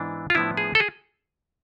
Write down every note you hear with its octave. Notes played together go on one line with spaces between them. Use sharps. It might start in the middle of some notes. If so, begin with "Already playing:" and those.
Already playing: G#2 E3 B3 D4
F4
A2 F3 B3 D4 E4
G#4
A4
G#4